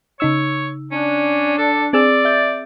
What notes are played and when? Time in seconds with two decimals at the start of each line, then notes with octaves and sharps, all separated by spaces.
0.20 C#3 D#4 C#5 E6
0.92 C#4 D4
1.58 A4
1.93 C4 G#4 D5 E6
2.25 E5 G6 A6